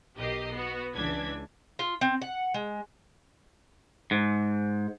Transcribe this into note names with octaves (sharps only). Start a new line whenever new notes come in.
B1 G4 A#4 D#5 C7
B3 F#4
C#2 E3 D4 G#6 B6
F4
C4
F#5
G#3
G#2